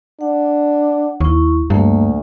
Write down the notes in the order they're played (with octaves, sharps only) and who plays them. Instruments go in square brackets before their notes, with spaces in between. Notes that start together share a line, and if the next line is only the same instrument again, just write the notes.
[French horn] D4 [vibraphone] F#5
[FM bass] D#2 [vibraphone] E4 C#6
[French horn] D2 [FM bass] G2 [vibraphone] A3 A#3